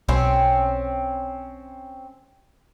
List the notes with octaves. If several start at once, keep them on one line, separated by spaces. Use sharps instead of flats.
B1 C4 C#4